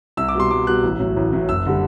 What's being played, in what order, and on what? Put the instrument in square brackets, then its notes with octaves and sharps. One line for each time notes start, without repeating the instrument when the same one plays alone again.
[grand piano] C2 E6
D6
B2 G3 C6
C2 D6
B2 G3 F#6
A1
A2 F#3
A1
A2 F#3
F#1 E6
D3 G3